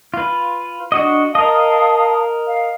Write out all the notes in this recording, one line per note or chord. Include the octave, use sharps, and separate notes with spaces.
F4 B4
D4 F#4 D#5
A#4 D#5 F5 A5 D#6
F5